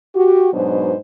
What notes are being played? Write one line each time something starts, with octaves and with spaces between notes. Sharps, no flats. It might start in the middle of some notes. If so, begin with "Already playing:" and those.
F#4 G4
G#2 B2 F#3 D4 B4 C5